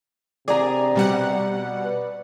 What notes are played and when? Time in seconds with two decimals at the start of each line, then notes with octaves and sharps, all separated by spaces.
0.48 C3 G#4 D5 A#5
0.96 B2 G3 F#5
1.84 B4